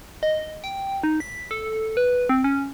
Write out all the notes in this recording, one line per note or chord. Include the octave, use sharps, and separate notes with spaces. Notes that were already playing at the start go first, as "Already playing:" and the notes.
D#5
G5
D#4
B6
A4
B4
C4
C#4